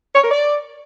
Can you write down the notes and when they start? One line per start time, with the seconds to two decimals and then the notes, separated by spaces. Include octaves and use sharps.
0.15 C#5
0.23 A#4
0.30 D5